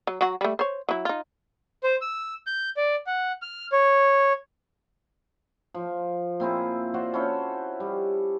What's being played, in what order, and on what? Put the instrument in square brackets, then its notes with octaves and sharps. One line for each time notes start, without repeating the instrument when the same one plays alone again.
[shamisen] F#3
F#3 F#4
G3 A3
C5 C#5
F#3 E4
D#4 F4
[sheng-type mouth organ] C5
E6
G6
D5
F#5
F6
C#5
[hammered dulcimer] F3
A#2 C4 E4 G#4
F4 F#4 C5 D5
C#4 E4 A4 C5
G3